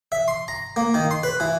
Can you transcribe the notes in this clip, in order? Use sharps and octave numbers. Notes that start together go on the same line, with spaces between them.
E5
C6
A#5
A#3
D#3
C6
B4
E3